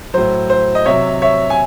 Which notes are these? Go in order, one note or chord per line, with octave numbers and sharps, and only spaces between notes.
A2 F#3 C5
C5
D#5
C3 F#3 C#5 E5
C#5 E5
G#5